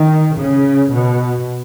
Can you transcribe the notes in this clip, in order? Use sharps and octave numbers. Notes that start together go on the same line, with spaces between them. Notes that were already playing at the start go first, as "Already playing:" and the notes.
Already playing: D#3
C#3
B2